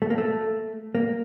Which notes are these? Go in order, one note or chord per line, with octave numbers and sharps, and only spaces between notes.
A3
A#3
A3
A#3